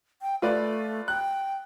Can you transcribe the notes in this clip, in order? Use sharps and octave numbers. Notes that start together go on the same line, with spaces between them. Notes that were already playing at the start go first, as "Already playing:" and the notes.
G5
A3 F4 B4 D5
G5 F#6